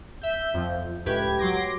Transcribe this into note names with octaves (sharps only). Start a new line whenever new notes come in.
E5 G6
F2 F3
C#2 A2 G4 B4 G#6
F#3 C6 D6 A#6